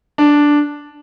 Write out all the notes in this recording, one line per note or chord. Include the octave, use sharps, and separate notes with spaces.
D4